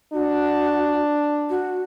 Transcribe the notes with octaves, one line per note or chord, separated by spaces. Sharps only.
D4 F#4
F#4